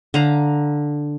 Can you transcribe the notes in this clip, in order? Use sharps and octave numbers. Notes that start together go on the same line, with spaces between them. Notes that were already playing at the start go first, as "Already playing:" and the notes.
D3 F5 A#5